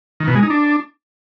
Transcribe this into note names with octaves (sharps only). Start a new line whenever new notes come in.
D#3
B2
G#3
D#4
D4